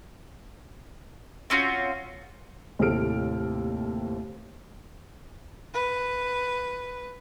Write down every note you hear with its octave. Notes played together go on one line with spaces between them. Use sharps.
C4 C#4 F4 F#4
D#2 A2 C3 A4 F6 D7
B4